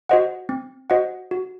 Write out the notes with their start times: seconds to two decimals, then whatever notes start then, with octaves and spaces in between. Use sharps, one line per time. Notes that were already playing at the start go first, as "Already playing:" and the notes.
0.09 F#4 C5 D#5 F#5
0.49 C4
0.90 F#4 C5 D#5 F#5
1.31 F#4